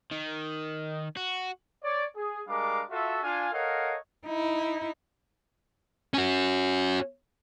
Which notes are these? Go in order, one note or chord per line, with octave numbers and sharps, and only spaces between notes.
D#3
F#4
C#5 D5
G#4
G3 G#3 D4 A#4 F5 D6
F4 F#4 A4 E5
D4 F4 F5 G#5
A4 A#4 C#5 D#5 F5 F#5
D#4 E4
C#4 F#4